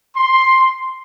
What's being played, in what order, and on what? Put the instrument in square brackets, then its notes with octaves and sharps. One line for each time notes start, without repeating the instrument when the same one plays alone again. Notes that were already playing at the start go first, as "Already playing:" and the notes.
[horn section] C6